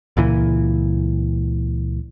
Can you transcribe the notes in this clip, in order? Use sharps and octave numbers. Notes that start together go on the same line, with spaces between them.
C#2 A#2 E3